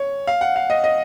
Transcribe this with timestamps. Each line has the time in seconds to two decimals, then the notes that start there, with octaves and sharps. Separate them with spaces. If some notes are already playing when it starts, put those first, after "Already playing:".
Already playing: C#5
0.27 F5
0.41 F#5
0.56 F5
0.70 D#5
0.84 D#5